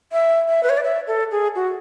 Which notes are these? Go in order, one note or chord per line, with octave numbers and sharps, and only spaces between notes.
E5
E5
B4
C#5
D5
E5
A4
G#4
F#4